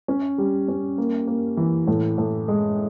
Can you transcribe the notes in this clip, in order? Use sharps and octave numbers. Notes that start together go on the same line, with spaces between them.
C#4
G3
C#4
A#3
A#3
E3
A2
A2
G#3